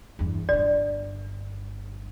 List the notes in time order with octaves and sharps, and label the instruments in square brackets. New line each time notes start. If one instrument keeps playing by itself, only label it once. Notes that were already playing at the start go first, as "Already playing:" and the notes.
[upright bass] E2 G2
[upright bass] G1 G2 [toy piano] D5